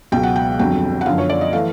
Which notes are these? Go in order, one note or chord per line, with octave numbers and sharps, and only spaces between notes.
C#2 B2 F#3 G5
F#5
G5
G1 F2 D3 F#3 G5
F#5
F#2 D3 F3 F5
C#5
D5
D#5
E3 A3 F5